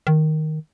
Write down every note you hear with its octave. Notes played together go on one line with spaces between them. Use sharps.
D#3